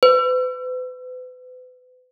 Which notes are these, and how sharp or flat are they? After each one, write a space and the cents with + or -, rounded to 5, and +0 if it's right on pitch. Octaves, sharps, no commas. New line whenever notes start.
B4 +40